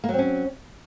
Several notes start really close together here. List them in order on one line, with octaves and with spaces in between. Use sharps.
A#3 F#3 C4 C#4